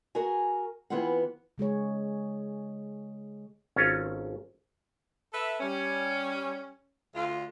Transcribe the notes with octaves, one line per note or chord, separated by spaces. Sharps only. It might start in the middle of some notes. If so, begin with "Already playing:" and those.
F#4 G#4 A#4 G#5
E3 B3 C4 F4 G#4 F#5
C#3 G#3 G#4 C#5
G#1 C#4 F4 A4 A#5
A4 B4 E5
G3 C#4
D2 D3 F4